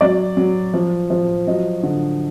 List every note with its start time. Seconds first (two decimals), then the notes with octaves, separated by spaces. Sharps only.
0.01 F#3 D5
0.37 F#3
0.74 F3
1.10 F3
1.47 F#3 D#5
1.83 D3